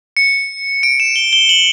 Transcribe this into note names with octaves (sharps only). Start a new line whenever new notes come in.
C#7
D7
E7
G7
G7
F#7